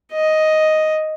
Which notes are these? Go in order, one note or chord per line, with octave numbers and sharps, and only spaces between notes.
D#5